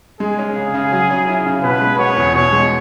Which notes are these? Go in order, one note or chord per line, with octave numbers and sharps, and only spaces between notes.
G#3 G#4
C#4
C#3
C#3
F#3
C#4
E4
C#3
B2 B4
G#3
B3 C#5
E2
B2 C#5
G#3